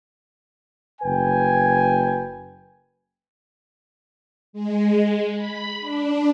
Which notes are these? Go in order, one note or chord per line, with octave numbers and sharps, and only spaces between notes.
F#1 B4 G5 G#5
G#3
B5
D4